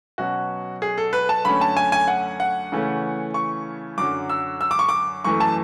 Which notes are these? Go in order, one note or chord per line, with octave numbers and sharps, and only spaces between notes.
B2 F#3 C#4 F#4
G#4
A4
B4
A5
F#2 D3 A3 C#4 B5
A5
G#5
G#5
F#5
F#5
C#3 E3 A3 C#4
C#6
F#2 D3 F#3 D6
E6
E6
D6
C#6
D6
F#2 E3 A3 C#6
A5